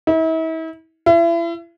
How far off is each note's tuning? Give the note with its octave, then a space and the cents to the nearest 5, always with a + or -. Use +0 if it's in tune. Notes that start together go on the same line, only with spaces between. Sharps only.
E4 -40
E4 +35